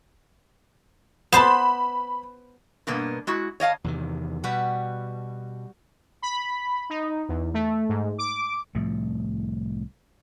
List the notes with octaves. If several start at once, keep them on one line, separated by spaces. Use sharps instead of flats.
B3 C5 A5 B5 E7
G2 B2 A#3 B3
G#3 E4 F#4
C#5 D#5 F5 A5
E2 C3 D#3
B2 G3 F#4 B4
B5
D#4
E2
A3
G#2
D6
C2 A2 F3 A3